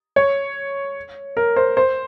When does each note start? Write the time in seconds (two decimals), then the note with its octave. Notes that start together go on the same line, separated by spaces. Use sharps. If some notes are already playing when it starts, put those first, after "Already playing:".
0.16 C#5
1.37 A#4
1.56 C5
1.77 C5